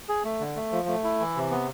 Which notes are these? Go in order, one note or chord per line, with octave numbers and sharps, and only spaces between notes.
G#4
A3
D3
A3
F3
A3
E4
E3
C3
B3